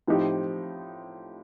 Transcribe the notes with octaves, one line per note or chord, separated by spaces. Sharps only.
A2 F3 C4 D#4 G4